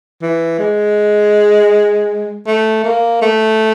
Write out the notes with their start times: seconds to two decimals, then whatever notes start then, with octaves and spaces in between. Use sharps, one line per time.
0.22 E3
0.59 G#3
2.47 A3
2.84 A#3
3.22 A3